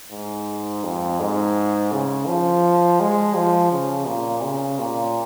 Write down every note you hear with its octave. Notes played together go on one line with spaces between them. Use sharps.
G#2
F2
G#2
C#3
F3
G#3
F3
C#3
A#2
C#3
A#2